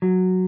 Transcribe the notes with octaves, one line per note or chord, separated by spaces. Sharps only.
F#3